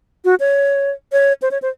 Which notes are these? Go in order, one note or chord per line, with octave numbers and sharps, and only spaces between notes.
F#4
C#5
C#5
C5
C#5
C5